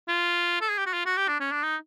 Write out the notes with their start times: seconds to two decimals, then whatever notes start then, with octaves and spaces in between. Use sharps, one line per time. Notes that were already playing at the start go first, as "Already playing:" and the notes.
0.08 F4
0.61 A4
0.69 G#4
0.78 G4
0.86 F#4
0.94 F4
1.06 F#4
1.17 G4
1.28 D4
1.40 C#4
1.52 D4
1.63 D#4